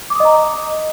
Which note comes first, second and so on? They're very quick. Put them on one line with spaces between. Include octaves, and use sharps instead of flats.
D6 D#6 D#5 A#5